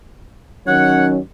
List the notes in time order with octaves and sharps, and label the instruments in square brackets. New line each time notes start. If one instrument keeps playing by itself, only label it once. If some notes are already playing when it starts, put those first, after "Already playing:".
[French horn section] D#3 F#3 C#4 [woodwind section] C#5 F#5